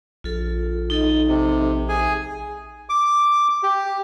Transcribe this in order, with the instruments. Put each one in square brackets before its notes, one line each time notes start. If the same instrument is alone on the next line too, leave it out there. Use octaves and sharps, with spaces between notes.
[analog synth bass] A#1 [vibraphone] F4 A4
[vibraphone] D#4 A4 D#5
[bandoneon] C3
G#4 G#5
[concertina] D6
G4